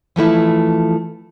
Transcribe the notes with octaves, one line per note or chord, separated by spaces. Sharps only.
E3 F3 A3 E4